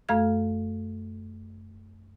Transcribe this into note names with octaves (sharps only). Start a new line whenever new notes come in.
F#2 A3 A4 F5 F6 G#6